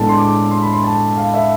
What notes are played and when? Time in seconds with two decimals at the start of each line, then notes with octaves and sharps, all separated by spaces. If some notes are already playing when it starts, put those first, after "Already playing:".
Already playing: A2 G#3 B3 D4 A5
0.09 C6
0.18 D6
0.51 C6
0.62 B5
0.73 C6
0.84 A5
1.17 F5
1.34 E5